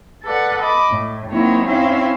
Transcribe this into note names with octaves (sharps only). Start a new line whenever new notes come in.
A4 B4 D5 F#5
D#5 B5 D6
A2
F#3 A#3 C4 D#4 E4 C#5
C4 C#4 D#4 E4 E5 F5